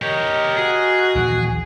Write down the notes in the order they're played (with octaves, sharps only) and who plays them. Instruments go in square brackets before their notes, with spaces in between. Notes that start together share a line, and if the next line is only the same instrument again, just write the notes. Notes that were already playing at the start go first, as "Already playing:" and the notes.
[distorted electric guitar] G4 C#5 [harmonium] A#4 D#5
[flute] F#4 [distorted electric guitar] G#4
[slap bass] A#1 D#2 E3